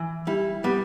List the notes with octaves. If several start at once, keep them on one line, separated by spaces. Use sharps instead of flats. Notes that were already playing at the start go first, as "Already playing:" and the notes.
Already playing: E3
G3 E4
G3 B3